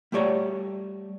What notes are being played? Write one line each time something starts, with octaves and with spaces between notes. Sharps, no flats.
G3 A3 G4 C#5 D5 A#5